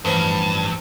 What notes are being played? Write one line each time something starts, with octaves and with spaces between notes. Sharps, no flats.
A1 G2 F3 A#5